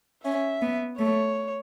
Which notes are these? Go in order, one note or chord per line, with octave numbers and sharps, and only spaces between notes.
C#4 E5
B3
A3 C#5